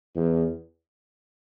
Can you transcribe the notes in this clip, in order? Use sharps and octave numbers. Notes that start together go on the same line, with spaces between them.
E2